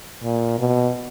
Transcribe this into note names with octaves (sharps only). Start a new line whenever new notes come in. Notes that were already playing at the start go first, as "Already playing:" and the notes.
A#2
B2